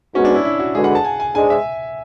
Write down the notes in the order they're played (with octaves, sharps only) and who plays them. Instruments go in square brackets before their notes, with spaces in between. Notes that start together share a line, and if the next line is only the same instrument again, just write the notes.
[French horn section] G#2 G#3 B3 F#4 [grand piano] C#4
[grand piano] D4
E4
E4
F#4
[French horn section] D3 G#3 D4 F#4 B4 [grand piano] G#4
[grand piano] F#5
A5
G#5
G#5
[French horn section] G#2 G#3 D4 [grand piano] G#5
[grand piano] E5